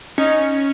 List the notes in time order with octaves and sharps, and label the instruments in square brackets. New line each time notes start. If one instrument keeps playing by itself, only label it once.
[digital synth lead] C#4 [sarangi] D#4